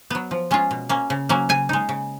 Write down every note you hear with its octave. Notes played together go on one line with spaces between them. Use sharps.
F#3 B3
F3
G#3 C#4 F4
B2
A#3 C#4
C#3
F#3 A#3 C#4
C#3 G#5
G#3 D#4
C#3